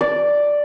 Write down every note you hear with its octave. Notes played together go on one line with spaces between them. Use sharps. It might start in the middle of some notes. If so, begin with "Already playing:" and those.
D5